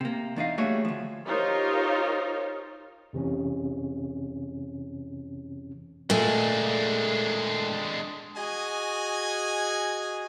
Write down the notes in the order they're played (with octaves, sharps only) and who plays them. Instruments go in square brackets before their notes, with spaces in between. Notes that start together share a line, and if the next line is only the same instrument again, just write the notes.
[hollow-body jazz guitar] C3 A#3
E2 D4 D#4 F5
G3 A3 A#3 F#4 G#4 C#5
D2 F3
[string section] D#4 F4 G4 A#4 C5 C#5
[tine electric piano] F2 C3 E3 C4 C#4
[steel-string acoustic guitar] A#2 A3 [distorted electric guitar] G#3 D4
[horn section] F#4 G#4 D#5 G#5